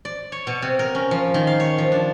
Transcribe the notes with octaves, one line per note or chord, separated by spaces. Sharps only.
D5
C#5
B2
C3
A#4
C#4
F3
D#3
F5
C#5
F3
D4